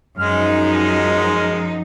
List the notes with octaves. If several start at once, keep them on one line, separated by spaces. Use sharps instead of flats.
F#2 F3 G#3 D#4 F6